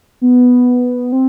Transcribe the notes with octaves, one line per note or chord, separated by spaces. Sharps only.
B3
C4